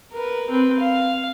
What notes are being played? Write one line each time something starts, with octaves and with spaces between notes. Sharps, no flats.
A#4 B4
C4 B4
F5